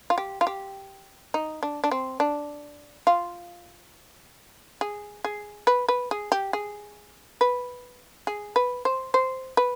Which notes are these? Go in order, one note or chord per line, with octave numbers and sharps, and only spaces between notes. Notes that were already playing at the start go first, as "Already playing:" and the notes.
F4
G4
F4
G4
D#4
D4
D4
C4
D4
F4
G#4
G#4
B4
B4
G#4
G4
G#4
B4
G#4
B4
C5
C5
B4